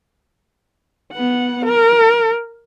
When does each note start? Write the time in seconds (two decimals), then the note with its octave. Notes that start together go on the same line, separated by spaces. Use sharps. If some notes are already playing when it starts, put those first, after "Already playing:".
1.13 B3 F#5
1.66 A#4